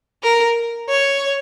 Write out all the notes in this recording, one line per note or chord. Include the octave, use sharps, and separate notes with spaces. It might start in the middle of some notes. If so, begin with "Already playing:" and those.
A#4
C#5